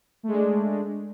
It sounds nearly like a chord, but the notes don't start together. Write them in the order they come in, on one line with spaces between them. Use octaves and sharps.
A3 G#3 D4